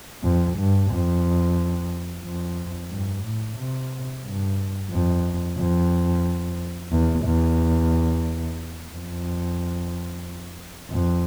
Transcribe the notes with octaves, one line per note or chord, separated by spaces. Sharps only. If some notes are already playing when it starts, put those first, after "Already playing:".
F2
G2
F2
F2
G2
A2
C3
G2
F2
F2
E2
E2
F2
F2